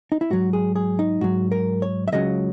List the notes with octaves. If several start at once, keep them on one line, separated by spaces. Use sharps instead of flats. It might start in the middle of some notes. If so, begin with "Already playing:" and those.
D#4
E4
G#2 F#3 F#4
G#4
G#4
D#4
G#2 F#3 F#4
A#4
C#5
E5
C#2 C#3 F#3 D#5